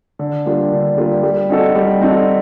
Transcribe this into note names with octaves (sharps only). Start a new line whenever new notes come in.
D3
G3 A#3 D4 F4
D3
G3 A#3 D4 F4
G3
C4 D#4 F#4 A4
G3
C4 D#4 F#4 A4